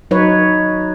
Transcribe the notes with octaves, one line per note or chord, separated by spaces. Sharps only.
F#3 D#4 B4 C#5